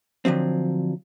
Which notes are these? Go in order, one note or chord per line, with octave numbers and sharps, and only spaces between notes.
D3 F3 F#3 C4